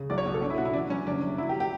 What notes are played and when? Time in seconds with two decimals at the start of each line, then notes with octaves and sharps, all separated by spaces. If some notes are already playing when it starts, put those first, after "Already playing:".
Already playing: C#3
0.10 B1 D5
0.18 C#5
0.26 B2
0.34 A4
0.41 B2 D4
0.50 E4
0.58 B2 F#4
0.65 E4
0.73 E3 D4
0.90 F#2 C#4
1.07 F#1 D4
1.22 F#1
1.38 F#3 E4
1.49 G4
1.60 G4